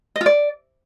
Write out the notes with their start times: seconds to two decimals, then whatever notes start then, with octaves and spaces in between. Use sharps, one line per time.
0.16 D#5
0.21 F4
0.26 D5